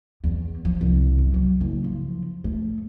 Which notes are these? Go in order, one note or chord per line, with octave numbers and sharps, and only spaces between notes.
E2
F3
C2
F#2
F#3
F#1
F3
A3